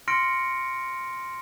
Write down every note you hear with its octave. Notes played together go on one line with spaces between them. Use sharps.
C6 F6 A#6 C#7 D7